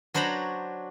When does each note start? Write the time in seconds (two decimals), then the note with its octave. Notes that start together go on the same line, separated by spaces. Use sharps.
0.14 F#3 D4 C5 C#5 A#5 B5